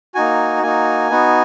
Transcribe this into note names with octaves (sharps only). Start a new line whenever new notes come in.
A#3 D#4 F#4 G#5
A#3 D#4 F#4 G#5
B3 D#4 F#4